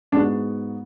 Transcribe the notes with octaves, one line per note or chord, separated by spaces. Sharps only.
G#2 G#3 B3 D4 F#4